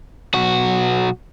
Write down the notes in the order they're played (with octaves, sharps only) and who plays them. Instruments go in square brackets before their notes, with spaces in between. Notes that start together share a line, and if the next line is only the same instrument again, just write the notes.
[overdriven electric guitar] B1 F#4